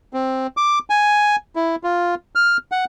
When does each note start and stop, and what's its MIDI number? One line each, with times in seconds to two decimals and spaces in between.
0.13 0.47 60
0.57 0.79 86
0.90 1.36 80
1.56 1.76 64
1.83 2.15 65
2.35 2.57 89
2.72 2.85 78